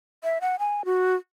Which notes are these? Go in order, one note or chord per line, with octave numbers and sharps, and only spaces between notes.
E5
F#5
G#5
F#4